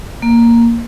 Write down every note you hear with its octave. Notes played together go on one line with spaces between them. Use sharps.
A#3